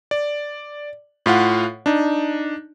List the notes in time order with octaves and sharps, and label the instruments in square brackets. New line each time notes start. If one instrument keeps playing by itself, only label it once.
[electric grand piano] D5
A2 F4 F5 F#5
D4 D#4